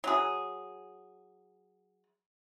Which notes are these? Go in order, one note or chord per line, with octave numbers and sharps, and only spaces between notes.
F#3 G#4